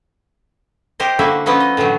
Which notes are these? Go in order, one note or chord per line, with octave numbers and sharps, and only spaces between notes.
G4 A#4 C5 D#5
D3 A3 A#3 E4 F#4 E5
F3 A3 B3 C#4 D#4 E4
D#5
A2 D3 E3 F#3 A3